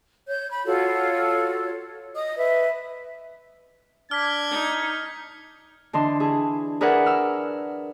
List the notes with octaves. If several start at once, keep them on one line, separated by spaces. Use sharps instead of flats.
C#5 G6
B5
F4 F#4 A4 C#5
D#5 D#6
B4 E5
D4 F6 G#6 B6
D#4
D3 E3 D4 D#5 C6
E4 G#4
G#4 A#4 B4 D5 E5 F#5
E6 F6